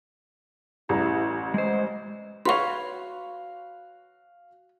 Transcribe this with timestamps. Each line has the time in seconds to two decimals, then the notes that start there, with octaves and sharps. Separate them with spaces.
0.89 A1 G3 E4 A#5
1.54 G#3 C5 D#5
2.45 F#4 B4 C#5 F5 C6 C#6 F7